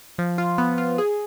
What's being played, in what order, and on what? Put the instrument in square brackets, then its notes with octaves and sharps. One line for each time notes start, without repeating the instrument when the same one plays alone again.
[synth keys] F3
F4
B3
F4
G#4